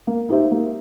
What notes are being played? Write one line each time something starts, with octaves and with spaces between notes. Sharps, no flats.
A#3
D#4 G4 C5 E5
A#3